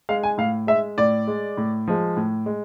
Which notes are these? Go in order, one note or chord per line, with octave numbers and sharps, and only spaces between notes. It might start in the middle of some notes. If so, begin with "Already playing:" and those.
G#3 F5
G#5
A2 F5
G#3 E5
A2 D5
G#3
A2
F3 G#3
A2
G#3